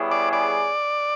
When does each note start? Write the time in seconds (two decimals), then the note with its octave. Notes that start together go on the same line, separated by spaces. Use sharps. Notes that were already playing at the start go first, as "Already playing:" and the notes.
Already playing: G3 B3 E4 G#4 C#5
0.11 D5
0.33 D5